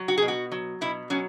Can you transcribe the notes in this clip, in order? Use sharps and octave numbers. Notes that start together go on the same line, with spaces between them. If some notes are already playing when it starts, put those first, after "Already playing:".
Already playing: F#3
F#4
B2 G#4
F#4
F#3
B2 E4
F#3 C#4